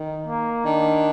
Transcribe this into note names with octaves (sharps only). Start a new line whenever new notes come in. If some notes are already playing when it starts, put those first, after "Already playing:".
Already playing: D#3
A#3
D#3 D4